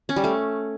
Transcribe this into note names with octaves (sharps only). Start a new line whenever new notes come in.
C#4
G3
A3